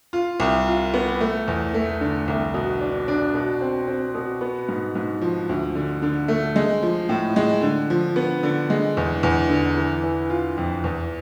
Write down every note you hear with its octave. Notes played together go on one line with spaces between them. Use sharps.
F4
C2
F4
B3
A3
E2
A3
D3
C2
B2
D4
D4
B2
C4
C4
B2
B3
G#2
G#2
F3
D2
D3
D3
A3
G#3
F3
A2
G#3
D3
F3
B3
D3
G#3
E2
E2
D3
E3
E3
F4
F2
E2